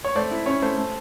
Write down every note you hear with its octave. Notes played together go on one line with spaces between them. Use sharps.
C#5
A3 C5 D5
E4
C#4 C#5
A3 C5
A3